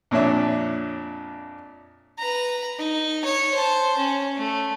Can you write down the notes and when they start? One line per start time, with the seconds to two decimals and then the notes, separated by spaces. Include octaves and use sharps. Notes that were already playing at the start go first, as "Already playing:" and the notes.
0.11 F2 A#2 D4 C#5 E5
2.19 B4 A#5
2.79 D#4
3.25 C#5
3.54 C5 A5
3.98 C#4
4.37 A3